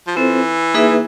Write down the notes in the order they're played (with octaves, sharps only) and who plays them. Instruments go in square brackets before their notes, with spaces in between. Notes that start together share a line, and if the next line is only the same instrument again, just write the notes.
[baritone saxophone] F3
[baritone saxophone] E3 [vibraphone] C4 F4 A4 C5
[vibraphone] A#3 D#4 G#4 B4 E5